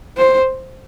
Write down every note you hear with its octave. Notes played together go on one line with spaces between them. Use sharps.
C5